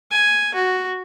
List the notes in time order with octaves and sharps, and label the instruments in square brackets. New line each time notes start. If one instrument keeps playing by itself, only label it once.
[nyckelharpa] G#5
F#4